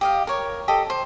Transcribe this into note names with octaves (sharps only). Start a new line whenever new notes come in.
G4 D#5 F5
A#4 C#5
G4 A4 D#5
C5